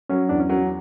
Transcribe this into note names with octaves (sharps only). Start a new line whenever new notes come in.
F#3 C#4
E2 D4
C#4
F#3